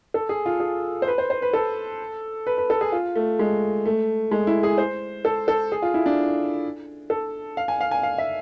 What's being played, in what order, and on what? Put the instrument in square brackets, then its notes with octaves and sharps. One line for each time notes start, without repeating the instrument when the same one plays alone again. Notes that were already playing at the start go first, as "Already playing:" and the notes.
[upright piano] A4
G#4
F4
G#4
C5
B4
C5
C5
B4
A4
B4
B4
A4
G#4
F4
A3
G#3
A3
G#3
E4
G#4
C5
A4
A4
G#4
F4
E4
D4
A4
F5
G#5
F5
G#5
F5
E5